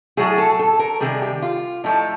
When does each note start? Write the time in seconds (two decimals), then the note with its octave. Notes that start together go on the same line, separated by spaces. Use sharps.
0.17 A2 F#3 A3 G#4
0.38 A4
0.59 A4
0.79 A#4
1.00 C3 D#3 G3 G#4
1.22 G4
1.42 F4
1.84 A2 F3 A3 D#4